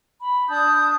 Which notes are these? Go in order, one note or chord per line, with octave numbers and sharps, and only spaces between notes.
B5
D4 A5 D#6 G6